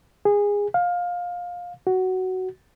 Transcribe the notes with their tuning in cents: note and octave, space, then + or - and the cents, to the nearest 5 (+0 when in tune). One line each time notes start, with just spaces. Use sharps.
G#4 -20
F5 +20
F#4 +10